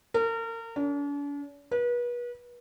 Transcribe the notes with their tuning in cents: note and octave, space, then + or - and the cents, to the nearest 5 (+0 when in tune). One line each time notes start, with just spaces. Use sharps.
A#4 -35
D4 -45
B4 -35